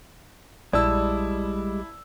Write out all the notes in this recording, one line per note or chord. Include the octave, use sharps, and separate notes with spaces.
A#1 G3 G#3 E4 D5 A5 E6